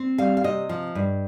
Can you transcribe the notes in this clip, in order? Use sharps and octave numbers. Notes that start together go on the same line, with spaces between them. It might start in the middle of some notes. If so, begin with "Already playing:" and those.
Already playing: C4
G3 F5
F5
C3 D#5
F3
G2